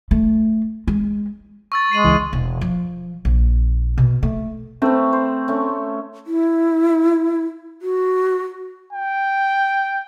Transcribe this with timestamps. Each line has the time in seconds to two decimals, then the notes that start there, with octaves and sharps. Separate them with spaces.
0.11 A3
0.88 G#3
1.72 C#6 E6 A6
1.91 G#3 C7 D#7 F#7
2.04 C#2 E3
2.33 E1
2.61 F3
3.25 A#1
3.98 B2
4.23 A3
4.82 A3 C4 B4
5.13 C5
5.48 A3 C#4
6.27 E4
7.82 F#4
8.93 G5